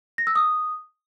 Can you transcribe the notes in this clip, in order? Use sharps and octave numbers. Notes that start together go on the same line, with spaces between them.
A#6
E6
D#6